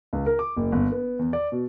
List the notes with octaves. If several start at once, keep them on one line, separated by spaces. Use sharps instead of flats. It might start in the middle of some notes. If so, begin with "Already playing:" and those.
C#2
A#4
D6
F#1
G1
B3
E2
D5
B2